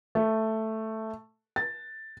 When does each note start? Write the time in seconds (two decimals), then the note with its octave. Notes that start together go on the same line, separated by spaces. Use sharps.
0.15 A3
1.56 A6